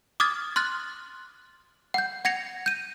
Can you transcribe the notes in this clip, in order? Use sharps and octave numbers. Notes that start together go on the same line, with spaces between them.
D6 D#6 F6 G#6 A6
C6 F6 F#6 A6
F#5 G6
F#5 G#6 A#6 C#7 F7
G6 D#7